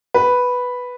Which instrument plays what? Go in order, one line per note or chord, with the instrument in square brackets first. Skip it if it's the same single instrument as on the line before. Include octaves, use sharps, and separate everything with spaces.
[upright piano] B4